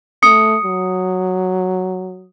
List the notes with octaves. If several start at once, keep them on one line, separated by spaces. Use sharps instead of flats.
A3 D#6 C#7
F#3